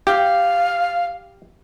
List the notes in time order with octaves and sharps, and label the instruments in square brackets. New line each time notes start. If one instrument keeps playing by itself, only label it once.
[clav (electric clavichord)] G4 [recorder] F5